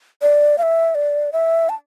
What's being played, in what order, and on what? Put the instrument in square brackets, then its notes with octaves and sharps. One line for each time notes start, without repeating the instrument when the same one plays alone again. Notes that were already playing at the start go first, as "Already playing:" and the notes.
[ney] D5
F5
E5
D5
E5
A5